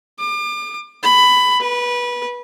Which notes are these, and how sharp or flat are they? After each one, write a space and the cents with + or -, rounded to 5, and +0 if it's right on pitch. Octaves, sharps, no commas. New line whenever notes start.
D6 +40
B5 +15
B4 -20